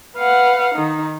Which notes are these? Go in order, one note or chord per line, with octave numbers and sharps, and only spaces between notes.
B4 F5 F#5
D#3 D#4